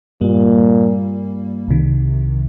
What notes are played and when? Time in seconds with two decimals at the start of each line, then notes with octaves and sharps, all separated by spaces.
0.21 G2 A#2 G3 A#3
1.68 C2 C3 D#3